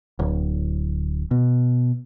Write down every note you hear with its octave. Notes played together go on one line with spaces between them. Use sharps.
D1
B2